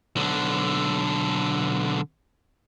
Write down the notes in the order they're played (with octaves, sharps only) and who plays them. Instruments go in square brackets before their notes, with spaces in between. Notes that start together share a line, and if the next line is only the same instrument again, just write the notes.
[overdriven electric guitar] B1 D3